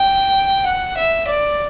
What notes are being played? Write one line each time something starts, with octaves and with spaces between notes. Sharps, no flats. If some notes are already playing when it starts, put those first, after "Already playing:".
Already playing: G5
F#5
E5
D5